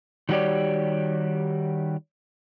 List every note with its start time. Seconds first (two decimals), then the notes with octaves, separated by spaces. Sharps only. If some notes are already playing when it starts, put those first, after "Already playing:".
0.29 D#3 G3 F#4 G4 C#5 D5